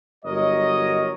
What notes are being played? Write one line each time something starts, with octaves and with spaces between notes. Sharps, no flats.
G1 F#3 A#4 C#5 D#5